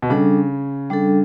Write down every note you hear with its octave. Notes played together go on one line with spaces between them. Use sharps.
B2
C#3 G3 D4 A4
G3 D4 A4